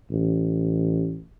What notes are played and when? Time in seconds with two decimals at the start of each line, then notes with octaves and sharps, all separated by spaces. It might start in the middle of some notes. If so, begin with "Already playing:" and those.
0.11 A1